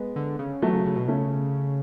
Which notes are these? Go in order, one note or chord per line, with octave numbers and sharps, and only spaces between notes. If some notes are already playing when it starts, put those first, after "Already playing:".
Already playing: G#3 B3
D3
C#3
E3 F#3 A3
C#3
C#3
B2
C#3 A3 C#4